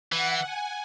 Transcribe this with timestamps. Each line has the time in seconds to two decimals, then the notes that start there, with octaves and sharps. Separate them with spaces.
0.12 E3 F#5
0.43 G#5